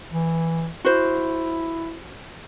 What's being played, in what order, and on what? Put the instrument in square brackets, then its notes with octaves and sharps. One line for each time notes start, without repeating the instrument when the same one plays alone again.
[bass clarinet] E3
[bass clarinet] E4 [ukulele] F#4 C5